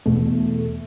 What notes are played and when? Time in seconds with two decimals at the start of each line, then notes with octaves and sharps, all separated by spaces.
0.06 E2 B2 A3